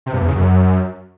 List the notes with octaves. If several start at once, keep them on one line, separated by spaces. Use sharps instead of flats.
C3
G2
E2
C#3
F#2